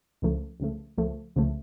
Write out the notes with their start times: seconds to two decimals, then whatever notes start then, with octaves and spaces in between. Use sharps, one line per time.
0.22 C#2 C#3 F3 A3
0.60 C#2 C#3 F3 A3
0.98 C#2 C#3 F3 A3
1.36 C#2 C#3 F3 A3